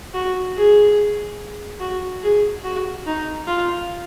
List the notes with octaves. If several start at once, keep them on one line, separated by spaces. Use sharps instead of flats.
F#4
G#4
F#4
G#4
F#4
D#4
F4